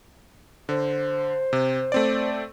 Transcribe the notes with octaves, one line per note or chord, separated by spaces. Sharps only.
D3 C5
C3
A3 C4 D5